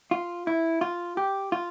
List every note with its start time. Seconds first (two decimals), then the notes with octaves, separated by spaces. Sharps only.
0.11 F4
0.47 E4
0.81 F4
1.17 G4
1.52 F4